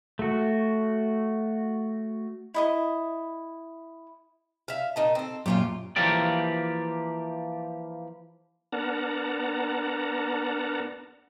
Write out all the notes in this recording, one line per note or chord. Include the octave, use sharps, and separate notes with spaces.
A3 F#4
E4 D#5 D#6
E5 F5
A#2 D#4 A5
C4 A4
F#2 A#2 C#4 F4 G4
E3 F3 A#3 G4 D5
B3 D4 A#4 F#5 A5 A#5